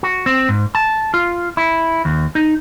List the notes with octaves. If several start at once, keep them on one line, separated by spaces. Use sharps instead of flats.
F#4
C4
G#2
A5
F4
E4
D#2
D#4